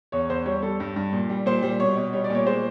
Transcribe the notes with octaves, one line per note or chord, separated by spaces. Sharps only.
E2 C#5
E2 C5
G3 C#5
G3 A4
G2
G2
A#2
G3
A#2 C5
G3
B2 C#5
B2
G3 C#5
D5
A#2 C#5
G#3 C5